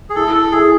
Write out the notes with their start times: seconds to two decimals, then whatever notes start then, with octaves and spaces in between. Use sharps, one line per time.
0.10 G#4
0.15 E4 A4
0.34 A4
0.52 E4 G#4